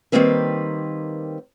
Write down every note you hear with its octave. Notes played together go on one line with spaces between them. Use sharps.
D#3 E3 G3 A#3 C4 B4